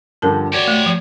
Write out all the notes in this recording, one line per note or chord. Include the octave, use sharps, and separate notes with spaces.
G2 D3 F3 A4 A#4 A5
F#4 G4 C#5 D5
A3
F3